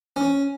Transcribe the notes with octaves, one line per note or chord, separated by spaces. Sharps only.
C#4